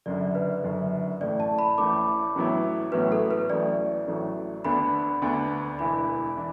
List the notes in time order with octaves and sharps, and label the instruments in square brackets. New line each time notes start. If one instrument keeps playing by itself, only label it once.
[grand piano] F#1 F#2 D3 [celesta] D5
[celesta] B4
[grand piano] F#1 F#2 D3
[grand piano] A1 A2 A3 [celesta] D5
[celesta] A5
B5
[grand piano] A1 A2 A3 [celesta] D6
[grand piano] A1 A2 F#3 B3 E4
[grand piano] A1 A2 F#3 B3 E4 [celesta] B4
[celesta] A4
B4
[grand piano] A1 A2 F#3 A3 [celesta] D5
[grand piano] A1 A2 F#3 A3
[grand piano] D2 D3 B3 D4 [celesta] B5
[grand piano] D2 D3 B3 D4
[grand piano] E1 E2 E3 D4 [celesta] B5
[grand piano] E3 D4